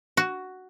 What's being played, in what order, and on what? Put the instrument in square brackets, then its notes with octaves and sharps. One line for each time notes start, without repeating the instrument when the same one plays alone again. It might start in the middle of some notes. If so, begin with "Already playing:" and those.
[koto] F#4